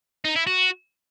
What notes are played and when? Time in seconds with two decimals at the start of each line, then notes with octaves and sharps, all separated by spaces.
0.25 D#4
0.36 E4
0.47 F#4